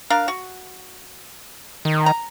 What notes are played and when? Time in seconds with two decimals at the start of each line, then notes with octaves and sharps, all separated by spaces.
0.10 D4 A#4 F5
0.28 F#4
1.85 D#3
2.06 A#5